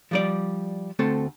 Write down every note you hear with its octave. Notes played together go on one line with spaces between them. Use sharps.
F3 G3 D5
D2 A3 C4 A4